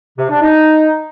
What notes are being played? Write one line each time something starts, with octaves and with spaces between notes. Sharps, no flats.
C3
D4
D#4